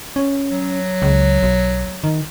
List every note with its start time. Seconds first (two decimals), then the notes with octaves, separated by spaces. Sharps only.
0.16 C#4
0.51 F#3
1.02 C#2
1.43 B1
2.04 D#3